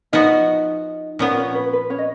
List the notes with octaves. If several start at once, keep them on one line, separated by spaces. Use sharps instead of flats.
F3 B3 D#4 F#4 D#5
A#2 F3 B3 C#4 C#5
C#4 C#5
B4
B4
C#4 C#5
D#5